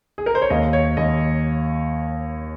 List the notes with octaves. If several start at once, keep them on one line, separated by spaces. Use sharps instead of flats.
G#4
A#4
C5
C#5
D#2 D#5
C#5
D#2 D#5